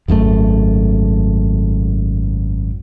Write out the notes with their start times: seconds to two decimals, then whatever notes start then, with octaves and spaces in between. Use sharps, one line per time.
0.08 G#1 F#2 D3 A3